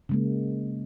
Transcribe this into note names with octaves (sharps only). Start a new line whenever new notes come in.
C#3 G#3 A#3